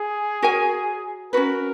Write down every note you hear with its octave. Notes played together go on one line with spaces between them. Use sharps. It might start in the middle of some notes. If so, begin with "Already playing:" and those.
Already playing: G#4
F#4 A#4 C#5 G#5
C#4 F#4 A#4 B4